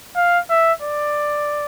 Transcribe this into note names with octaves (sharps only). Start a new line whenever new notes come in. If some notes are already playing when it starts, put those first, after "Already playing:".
F5
E5
D5